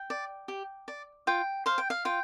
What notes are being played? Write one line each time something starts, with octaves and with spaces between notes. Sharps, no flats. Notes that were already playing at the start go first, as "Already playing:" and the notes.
Already playing: G5
D5
G4
D5
F4 G5
C5 F5
G5
F5
F4 G5